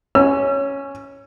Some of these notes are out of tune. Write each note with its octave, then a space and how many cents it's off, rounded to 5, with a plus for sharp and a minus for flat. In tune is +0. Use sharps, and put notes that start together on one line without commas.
C#4 +0 E6 +45